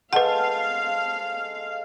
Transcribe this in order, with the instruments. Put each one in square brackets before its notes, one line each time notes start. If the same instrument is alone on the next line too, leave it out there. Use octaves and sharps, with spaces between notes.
[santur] G#3 A4 C5 [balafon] B4 F#5 [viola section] F5